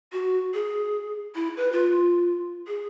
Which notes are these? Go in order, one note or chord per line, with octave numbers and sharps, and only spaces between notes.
F#4
G#4
E4
B4
F4
G#4